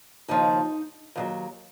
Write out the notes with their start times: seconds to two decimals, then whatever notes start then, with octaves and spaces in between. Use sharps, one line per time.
0.28 D#2 C#3 F3 D#4
1.15 D#2 D#3 F#3